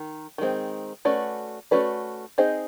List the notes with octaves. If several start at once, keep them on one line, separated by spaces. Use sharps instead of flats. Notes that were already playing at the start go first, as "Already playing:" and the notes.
Already playing: D#3
D#3 G#3 C4
A3 C#4 F#4 B4 D5
A3 C#4 F#4 B4 D5
C4 D#4 G#4 C5 D#5